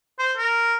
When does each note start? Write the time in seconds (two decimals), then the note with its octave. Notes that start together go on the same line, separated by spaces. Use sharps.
0.19 C5
0.37 A#4